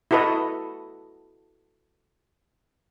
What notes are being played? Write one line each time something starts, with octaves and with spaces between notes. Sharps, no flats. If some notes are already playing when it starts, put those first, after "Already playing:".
E4 F#4 A4 B4 D#5